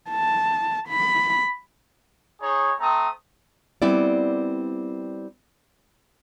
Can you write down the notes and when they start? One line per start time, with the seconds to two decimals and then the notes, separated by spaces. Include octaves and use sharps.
0.10 A5
0.89 B5
2.42 D#4 G#4 C#5
2.80 A3 C4 A#5 D#6
3.82 G3 B3 C4 E4 D5